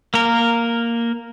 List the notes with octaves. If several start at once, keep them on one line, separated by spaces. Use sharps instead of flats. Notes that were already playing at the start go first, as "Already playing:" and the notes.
A#3 A#4